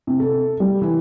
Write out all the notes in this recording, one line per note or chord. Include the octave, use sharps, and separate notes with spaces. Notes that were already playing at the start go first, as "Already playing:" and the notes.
C3
A4
G3
E3